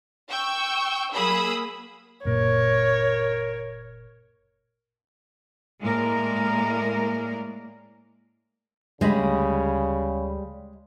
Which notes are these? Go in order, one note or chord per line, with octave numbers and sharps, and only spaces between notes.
G5 C#6 E6 G6
F#3 A#3 G#4 B5 D#6 E6
F#1 A#2 A#4 C#5
A2 G#3 A#3 A#4 D5
D2 C#3 G3 G#3 D#5 B5